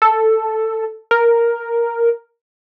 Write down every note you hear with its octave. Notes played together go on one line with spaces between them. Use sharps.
A4
A#4